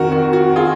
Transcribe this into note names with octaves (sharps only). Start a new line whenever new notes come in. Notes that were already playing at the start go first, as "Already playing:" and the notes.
Already playing: F2 D#3 F#4 A#4
F#4
F#4
F4 G#4